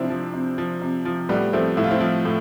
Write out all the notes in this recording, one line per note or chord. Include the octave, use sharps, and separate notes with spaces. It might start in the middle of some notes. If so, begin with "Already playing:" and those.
Already playing: C3 F3 C4 D4 E4
F3
C3
F3
C3
F3
A2 G3 B3
F3 A3 C4
A2 E4
F4
C4 E4
F3
A2